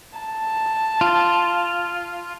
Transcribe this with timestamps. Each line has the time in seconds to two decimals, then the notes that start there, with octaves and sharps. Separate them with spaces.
0.18 A5
1.01 F4